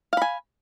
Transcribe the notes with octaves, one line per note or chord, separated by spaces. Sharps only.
F5 G#5 B5